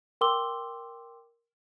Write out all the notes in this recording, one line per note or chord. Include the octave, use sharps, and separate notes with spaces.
A#4 G5 C6 D6 E6 G7